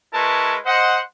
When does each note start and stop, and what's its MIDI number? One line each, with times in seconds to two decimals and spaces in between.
0.13 0.57 56
0.13 0.57 64
0.13 0.57 70
0.13 0.57 71
0.13 0.57 81
0.13 0.57 85
0.65 1.00 72
0.65 1.00 75
0.65 1.00 78